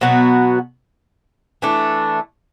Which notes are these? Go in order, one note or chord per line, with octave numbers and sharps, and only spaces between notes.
B2 F#3 B3 F#4
E3 A3 D4